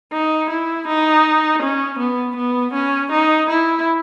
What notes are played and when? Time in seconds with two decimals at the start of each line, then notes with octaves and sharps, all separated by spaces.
0.13 D#4
0.50 E4
0.88 D#4
1.63 C#4
1.99 B3
2.37 B3
2.74 C#4
3.12 D#4
3.50 E4